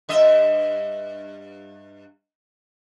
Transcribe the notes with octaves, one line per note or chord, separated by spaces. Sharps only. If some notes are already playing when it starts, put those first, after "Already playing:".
G2 D#5 E5